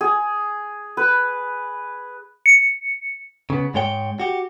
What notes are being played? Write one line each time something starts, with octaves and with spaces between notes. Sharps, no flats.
G#4
B4
C#7
C#3 B3
G#2 G#3 C#5 G5
F#4 G4